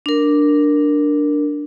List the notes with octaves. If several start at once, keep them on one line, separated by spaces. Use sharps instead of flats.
D4 A#4